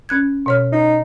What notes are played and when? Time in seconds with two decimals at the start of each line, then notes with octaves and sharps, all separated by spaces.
0.09 C#4 F#6 G#6
0.46 B2 C#5 F6
0.72 D#4